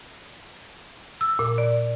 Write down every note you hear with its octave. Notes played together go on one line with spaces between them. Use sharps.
E6
A#2
D5